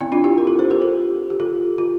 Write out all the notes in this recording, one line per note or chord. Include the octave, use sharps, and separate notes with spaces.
C4 E4
D4 F4
E4 G4
A#4
F4 A4
A4 C5
G4 A#4
F4 A4
G4
F4 A4
F4